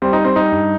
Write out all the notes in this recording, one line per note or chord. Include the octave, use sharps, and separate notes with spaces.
G3 C4
D#4
G3
C4
G3 D#4
G2